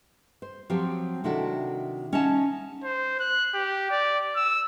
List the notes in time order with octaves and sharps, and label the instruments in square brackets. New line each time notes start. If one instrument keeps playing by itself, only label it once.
[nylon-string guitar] C5
F3 F#3 C4 G4 C#5
C3 D#3 D4 E4 F#4 A4
C#4 D#4 C#5 E5 F#5 A5
[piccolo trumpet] C5
F#6
G4
D5
E6